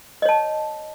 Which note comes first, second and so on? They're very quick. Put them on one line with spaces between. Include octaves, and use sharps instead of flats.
D#5 C#5 A5